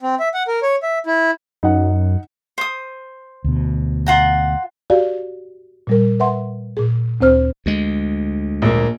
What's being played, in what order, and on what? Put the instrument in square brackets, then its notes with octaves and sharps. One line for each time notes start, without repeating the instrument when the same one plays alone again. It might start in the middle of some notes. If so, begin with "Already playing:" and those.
[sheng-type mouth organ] C4
E5
F#5
A#4
C#5
E5
E4
[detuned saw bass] F#2 [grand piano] D#4 F#5
[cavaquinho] C5 D#6
[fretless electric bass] D2 B2
[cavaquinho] F4 F#5 A#5
[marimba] F#4 G4 D5 F5
A#2 G3 A#4
B4 E5 F#5 C6
A#2 G#4
D2 C4 C5 F6
[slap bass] D2 G#3
[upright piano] A#1 A#3